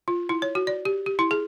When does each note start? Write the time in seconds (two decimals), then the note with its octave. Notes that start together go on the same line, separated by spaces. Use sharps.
0.08 F4
0.29 E4
0.42 C#5
0.55 F#4
0.67 D5
0.85 G4
1.06 G4
1.19 E4
1.31 G#4